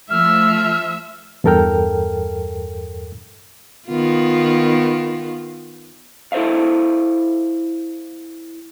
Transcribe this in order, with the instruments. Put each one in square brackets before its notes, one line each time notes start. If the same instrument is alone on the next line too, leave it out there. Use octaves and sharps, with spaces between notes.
[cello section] F3 A3 [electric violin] E5 E6 [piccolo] F6
[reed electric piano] E2 G2 A4 A#4 G5 F6
[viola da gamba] D#3 B3 F4
[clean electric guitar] E4 A4 C5 E5 F5